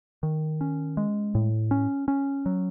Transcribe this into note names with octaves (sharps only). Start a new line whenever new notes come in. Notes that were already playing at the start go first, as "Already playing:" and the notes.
D#3
C#4
G#3
A2
C#4
C#4
F#3